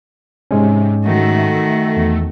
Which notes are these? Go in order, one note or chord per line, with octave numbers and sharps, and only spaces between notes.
G#2 C3 G#3 C#4
D#3 A3 F#4
E2